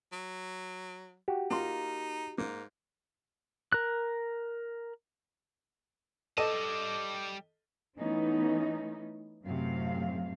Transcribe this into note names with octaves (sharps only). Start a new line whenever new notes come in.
F#3
F#4 G4
A#3 D#4 F4 C6
G#2 A#3
A#4 F#6
G3 A4 D#5 A5 D6 D#7
E3 A3 B3 C#4 D#4
F#2 A2 C3 F#3 A3 F5